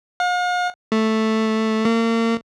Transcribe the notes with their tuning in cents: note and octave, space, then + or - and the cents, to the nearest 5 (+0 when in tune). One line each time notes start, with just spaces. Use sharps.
F5 +45
A3 +0
A#3 -35